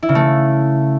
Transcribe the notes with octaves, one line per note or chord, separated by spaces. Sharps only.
E4
C#3
A3